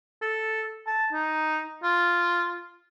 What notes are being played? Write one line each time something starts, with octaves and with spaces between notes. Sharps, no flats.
A4
A5
D#4
F4